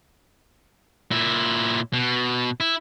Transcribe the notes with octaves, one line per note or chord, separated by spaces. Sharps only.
A#2 E4
B2
E4